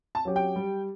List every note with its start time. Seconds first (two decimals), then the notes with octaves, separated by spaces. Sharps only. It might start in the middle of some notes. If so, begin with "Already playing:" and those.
0.15 A5
0.25 F#3 C#4 G4
0.36 G5
0.56 G3